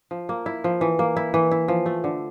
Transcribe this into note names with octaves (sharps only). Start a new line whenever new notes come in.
F3
A#3
E4
F3
E3
A#3
E4
E3
E4
F3
A3
D3